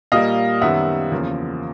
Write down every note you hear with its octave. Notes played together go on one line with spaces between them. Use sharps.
A#2 G3 A#3 D#5 F5
F#2 D#3 G3 B3 E5 F#5
E2 C#3 F3 A#3